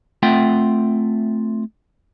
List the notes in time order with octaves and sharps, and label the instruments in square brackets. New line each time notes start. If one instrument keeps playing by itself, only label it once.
[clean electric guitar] A3 C4 F4 E5 F#5 G5